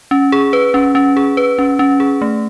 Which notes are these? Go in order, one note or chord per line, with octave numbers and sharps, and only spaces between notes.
C#4
G#4
B4
C#4
C#4
G#4
B4
C#4
C#4
G#4
A3